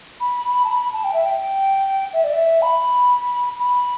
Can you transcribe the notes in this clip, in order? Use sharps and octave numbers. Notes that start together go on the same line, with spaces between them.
B5
B5
A5
B5
A5
G5
E5
G5
E5
D5
E5
B5
B5